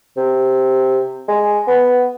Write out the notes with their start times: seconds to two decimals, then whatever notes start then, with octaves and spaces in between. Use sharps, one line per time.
0.17 C3
1.28 G#3
1.67 B3